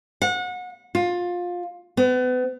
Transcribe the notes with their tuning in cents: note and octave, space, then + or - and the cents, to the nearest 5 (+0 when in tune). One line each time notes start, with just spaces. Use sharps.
F#5 -30
F4 +20
B3 +35